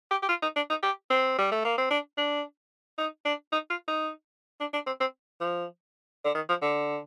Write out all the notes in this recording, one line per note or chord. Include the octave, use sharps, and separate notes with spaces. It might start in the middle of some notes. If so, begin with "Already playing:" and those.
G4
G4
F4
D#4
D4
D#4
G4
C4
G3
A3
A#3
C4
D4
D4
D#4
D4
D#4
F4
D#4
D4
D4
C4
C4
F3
D3
D#3
F3
D3